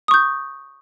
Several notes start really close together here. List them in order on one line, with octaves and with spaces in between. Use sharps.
D#6 C#6 G6